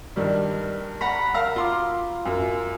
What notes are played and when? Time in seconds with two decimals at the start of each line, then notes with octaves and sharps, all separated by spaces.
0.16 G2 D#3 G3
1.01 F#5 A#5 B5
1.34 A#4 F5 A#5 E6
1.56 F4 F5 C6 D6
2.25 F#2